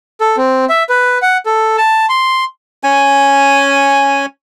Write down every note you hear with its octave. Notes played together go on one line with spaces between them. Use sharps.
A4
C4
E5
B4
F#5
A4
A5
C6
C#4 G#5